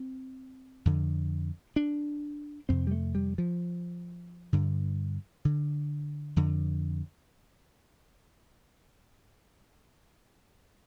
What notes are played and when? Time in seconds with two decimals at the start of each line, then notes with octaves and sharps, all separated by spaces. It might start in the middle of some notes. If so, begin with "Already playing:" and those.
Already playing: C4
0.85 F2 D3
1.76 D4
2.69 F2 C3 C4
2.87 G3
2.91 A3
3.15 G3
3.38 F3
4.53 G2 D3
5.45 D3
6.36 F2 D3